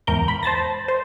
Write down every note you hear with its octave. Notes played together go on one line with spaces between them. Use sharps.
E2 G#2 A#4 G6
B5
C5 A5 A6 A#6
C5